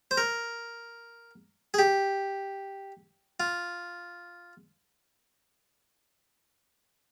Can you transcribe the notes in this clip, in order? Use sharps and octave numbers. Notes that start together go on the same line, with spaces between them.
C5
A#4
G#4
G4
F4